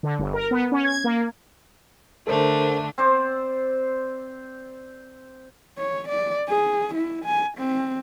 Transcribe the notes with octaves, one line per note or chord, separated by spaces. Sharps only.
D3
G1
A#4
B3
C#4
G#6
A#3
D3 A3 D4 A4 A#4 C5
C4 C5 D5
C#5
D5
G#4
E4
G#5
C4